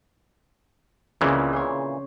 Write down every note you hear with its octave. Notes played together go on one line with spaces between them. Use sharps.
C#2 A#2 C#3 E3 C4
C5 C#5